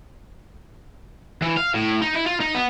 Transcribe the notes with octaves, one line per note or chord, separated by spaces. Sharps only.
E3
F5
A2
D#4
E4
F4
D#4
B3